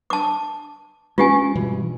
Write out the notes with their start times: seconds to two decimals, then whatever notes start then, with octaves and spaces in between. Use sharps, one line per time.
0.10 A5 D6
1.18 G#3 A3 C#4 F4 G4 G#5
1.55 G2 B2 E3